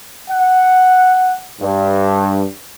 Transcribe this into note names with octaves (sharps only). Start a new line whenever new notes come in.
F#5
G2